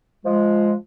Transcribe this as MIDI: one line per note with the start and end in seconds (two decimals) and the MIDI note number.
0.25 0.73 53
0.25 0.73 56